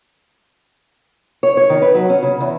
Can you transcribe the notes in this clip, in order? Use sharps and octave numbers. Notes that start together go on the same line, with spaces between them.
C#5
C#5
D#3
B4
F#3
C#4
C#3
E2